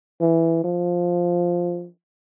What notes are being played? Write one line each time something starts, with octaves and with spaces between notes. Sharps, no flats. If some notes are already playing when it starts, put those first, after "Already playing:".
E3
F3